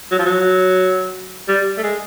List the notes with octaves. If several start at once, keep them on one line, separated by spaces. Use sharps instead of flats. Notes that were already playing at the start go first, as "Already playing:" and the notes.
F#3
F3
F#3
G3
A3
G#3